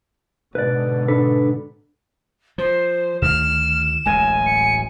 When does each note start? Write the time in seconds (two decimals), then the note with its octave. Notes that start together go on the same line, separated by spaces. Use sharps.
0.55 G#2 B2 D3 B4 D5
1.08 D4 A4 B4
2.58 F3 C5
3.22 D2 D#3 A3 F6 E7
4.05 D1 A1 G#3 G#5
4.46 C#7